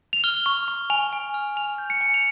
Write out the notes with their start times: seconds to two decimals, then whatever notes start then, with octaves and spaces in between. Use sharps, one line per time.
0.13 F7
0.24 F6 G7
0.46 C#6
0.68 C#6
0.90 G#5 F7
1.13 G#5
1.34 F6
1.56 G#5 F7
1.78 G6
1.90 C#7
2.01 G#5
2.14 F7